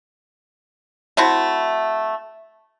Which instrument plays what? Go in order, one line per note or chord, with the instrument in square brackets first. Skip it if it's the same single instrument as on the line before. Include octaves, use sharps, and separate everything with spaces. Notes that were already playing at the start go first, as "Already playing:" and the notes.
[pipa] A3 C4 E4 F#4